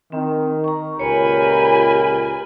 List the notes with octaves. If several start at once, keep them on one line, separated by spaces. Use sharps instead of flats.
D#3 C4
A#5 C#6
C#2 A#2 G4 A#4 C#5 G#5 B5